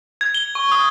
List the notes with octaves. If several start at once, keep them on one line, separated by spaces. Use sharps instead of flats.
G#6
G7
C#6
D#6